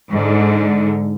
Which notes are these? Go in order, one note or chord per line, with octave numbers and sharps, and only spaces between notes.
G#2 D3